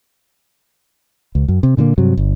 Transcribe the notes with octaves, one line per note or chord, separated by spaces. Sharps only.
C#2
F#2
C3
A#2 D3 E3 A#3
G2 C3 F#3
G1